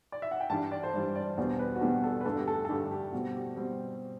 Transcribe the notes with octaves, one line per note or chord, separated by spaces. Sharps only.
D5
E5
F#5
G5
G2 E3 G3 D4 A5
D5
C5
G2 E3 G3 D4
D5
E2 B2 G3 B3 D4 C5
B4
F#4
E2 B2 G3 B3 D4 G4
A4
B4
G2 D3 A3 D4 A4
G4
A4
A4
G2 D3 A3 D4 G4
G4
B2 G3 C4 F#4
G4
B2 G3 C4